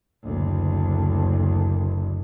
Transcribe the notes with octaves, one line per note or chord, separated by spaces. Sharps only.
F#1 D2